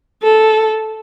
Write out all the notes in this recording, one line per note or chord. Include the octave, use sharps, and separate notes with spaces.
A4